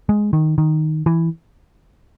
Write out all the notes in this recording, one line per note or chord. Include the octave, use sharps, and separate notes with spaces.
G#3
D#3
D#3
E3